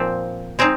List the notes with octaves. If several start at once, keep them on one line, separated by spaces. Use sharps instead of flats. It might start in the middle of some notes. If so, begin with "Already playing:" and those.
Already playing: A#2 F3 C4
G#3 C4 D#4